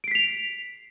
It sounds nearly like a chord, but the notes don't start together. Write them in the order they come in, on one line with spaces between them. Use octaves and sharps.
D7 C7 B6 F7